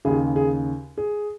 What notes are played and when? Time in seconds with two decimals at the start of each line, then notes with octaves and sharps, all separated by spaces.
0.05 D#2 C#3 G#4
0.36 G#4
0.98 G#4